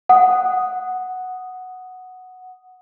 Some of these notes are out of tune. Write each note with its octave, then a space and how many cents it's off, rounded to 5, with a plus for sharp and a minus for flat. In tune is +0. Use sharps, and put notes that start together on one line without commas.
F#5 +0 D#6 +0